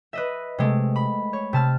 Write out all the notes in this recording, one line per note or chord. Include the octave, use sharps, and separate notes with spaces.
B4 D#5 E5
C3 G#3 A3
B5
C#5
C3 A5 F6